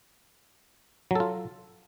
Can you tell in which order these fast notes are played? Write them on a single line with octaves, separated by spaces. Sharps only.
F#3 A4 F4